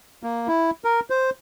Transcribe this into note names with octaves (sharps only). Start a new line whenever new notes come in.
A#3
E4
A#4
C5